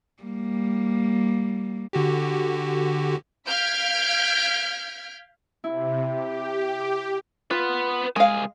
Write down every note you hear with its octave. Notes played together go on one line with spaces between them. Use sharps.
G3 A#3
D3 F#4 G4
F5 F6 G6 G#6 B6 D7
C3 E4
G4
D6
B3 F4 B4
C2 G#3 F5 G#5